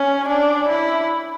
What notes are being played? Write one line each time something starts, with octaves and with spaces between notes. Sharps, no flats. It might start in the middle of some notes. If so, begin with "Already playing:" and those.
Already playing: C#4
D4
E4